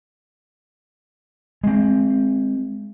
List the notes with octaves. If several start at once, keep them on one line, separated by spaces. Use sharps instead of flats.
G#3 C4